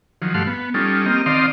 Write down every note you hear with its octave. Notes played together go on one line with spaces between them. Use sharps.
D#3 F3 F#3
G2 A3 F5 F#5 C6
B3
G3 C#4 D#4 F4 A4
A#3 C4 G4 D#5 F6
D#3 C4 D5 D#5 F5 C6